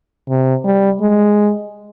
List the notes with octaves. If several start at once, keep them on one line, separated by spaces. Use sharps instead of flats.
C3
G3
G#3